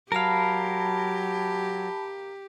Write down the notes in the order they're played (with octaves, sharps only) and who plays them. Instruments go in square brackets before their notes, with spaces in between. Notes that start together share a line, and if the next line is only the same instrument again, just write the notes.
[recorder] F#3 [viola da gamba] G4 [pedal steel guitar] A#4 F5 [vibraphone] A5 B5